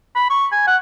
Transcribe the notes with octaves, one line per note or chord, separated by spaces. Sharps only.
B5
C#6
G#5
F#5